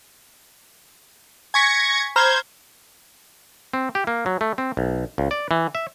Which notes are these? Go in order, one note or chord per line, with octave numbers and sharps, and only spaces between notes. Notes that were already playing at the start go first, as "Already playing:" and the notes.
G#5 C#6 G#6 A#6 B6 C#7
C5 A#5 B5 F6 G6 G#6
C4
G4
A#3
F#3
A3
C4
B1
C#2
D5
E3
E5